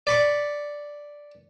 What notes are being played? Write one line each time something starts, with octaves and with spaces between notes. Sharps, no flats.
D5 B5 C#6